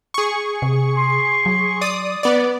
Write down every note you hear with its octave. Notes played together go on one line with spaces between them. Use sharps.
G#4 C#6
C3
C6
F#3
D5 D#6
B3 D5